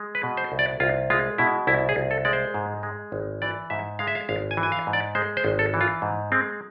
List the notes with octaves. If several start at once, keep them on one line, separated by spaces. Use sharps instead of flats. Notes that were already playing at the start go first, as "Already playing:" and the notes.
Already playing: G#3
B4
B2
C5
C2
D5
C2 F4
G#3 F4
B2 E4
C2 E4
G#4
C2
A4
G#3 D5
C5
G#2
G#3
G#1
E3 D5
G#2 E5
G#3 F5
E5
F5
G#1 F5
G#5
E3
G#5
F5
G#2
D5
G#3 C5
C5
G#1
A4
E3
F4
G#2
G#3 C4